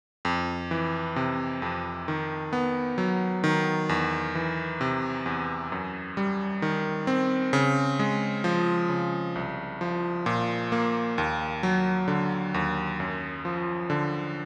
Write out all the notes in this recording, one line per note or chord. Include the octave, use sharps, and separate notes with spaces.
F2
E3
C3
F2
D#3
B3
F#3
D#3
E2
E3
C3
E2
F#2
G3
D#3
C4
C#3
G#3
F3
C#3
C2
F3
A#2
A#3
D#2
F#3
D3
D#2
F#2
F3
D3